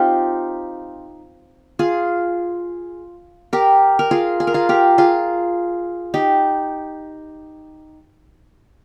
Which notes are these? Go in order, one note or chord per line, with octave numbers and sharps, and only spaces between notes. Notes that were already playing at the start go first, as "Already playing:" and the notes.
Already playing: C4 D#4 F4 G4
F4 G#4
G4 A#4
A#4
F4 G#4
G#4
A#4
F4 G#4
G4 A#4
F4 G#4
D#4 G4